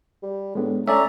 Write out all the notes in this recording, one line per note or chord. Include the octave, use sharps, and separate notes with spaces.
G3
A2 G#3 B3 D4
A3 C#4 A4 D5 E5 A#5